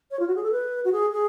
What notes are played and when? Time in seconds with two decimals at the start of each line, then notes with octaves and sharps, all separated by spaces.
0.11 C#5
0.19 F4
0.27 F#4
0.35 G#4
0.43 A4
0.52 B4
0.85 F#4
0.92 G#4
1.12 G#4